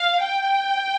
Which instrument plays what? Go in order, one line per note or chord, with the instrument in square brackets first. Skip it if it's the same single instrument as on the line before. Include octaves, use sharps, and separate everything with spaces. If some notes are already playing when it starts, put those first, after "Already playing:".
Already playing: [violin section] F5
G5